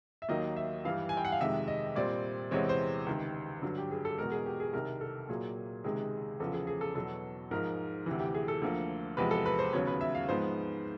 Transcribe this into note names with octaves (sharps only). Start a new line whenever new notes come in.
E5
D#2 D#3 F#3 A#3 D#5
E5
G2 E3 G3 F5
G#5
G5
F#5
F5
F2 C3 D#3 G#3 E5
D#5
A#2 G3 C4 D5
E2 C3 E3 G#3 C4 C#5
C5
C#2 C3 D#3
G2 D3 F#3
G4
G#4
A4
E2 B2 G#3 A#4
G#4
G4
G#4
C2 C3 D#3 A#4
A4
A#2 F#3 A#3 G#4
C#2 C3 D#3 G#3 G#4
E2 C#3 F3 A4
G#4
G#4
A4
E2 B2 F#3 A4
G#2 F3 G#3 A#4
D2 C3 E3
G4
G#4
A4
D2 D3 F3 A#3
E2 C3 F3 G#3 B4
A4
B4
C5
D#2 C#3 F#3 B3 C#5
B4
E5
F5
G#2 F3 G#3 B3 C5